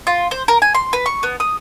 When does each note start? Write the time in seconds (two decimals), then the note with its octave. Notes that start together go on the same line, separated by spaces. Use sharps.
0.07 F4
0.31 C5
0.48 A#4
0.62 G#5
0.74 C6
0.93 B4
1.06 C#6
1.23 B3
1.40 D#6